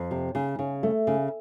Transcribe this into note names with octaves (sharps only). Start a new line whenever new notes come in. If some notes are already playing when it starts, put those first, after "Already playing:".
Already playing: F2
C3
C#3
C#3
A3
C#3